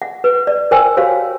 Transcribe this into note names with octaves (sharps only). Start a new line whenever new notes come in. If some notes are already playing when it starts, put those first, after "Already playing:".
F#5
B4
D5
A#4 C5 G5 G#5 E6
F#4 G4 C5 C#5 F5